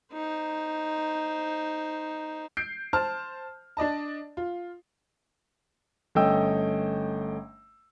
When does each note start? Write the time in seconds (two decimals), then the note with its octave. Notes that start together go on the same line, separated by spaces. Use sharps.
0.13 D#4 C5
2.57 G6 C7 D7
2.93 C5 A5 F6
3.77 D4 D5 D#5 A5
4.37 F4
6.15 G1 A3 C#4 D#5 G5 E6